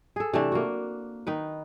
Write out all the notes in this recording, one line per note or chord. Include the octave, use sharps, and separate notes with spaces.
G#4 A4
C3 E3 A3 D4
A#3 F#4
D#3 D#4 B4